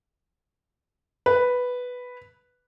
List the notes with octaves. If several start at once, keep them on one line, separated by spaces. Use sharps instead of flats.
B4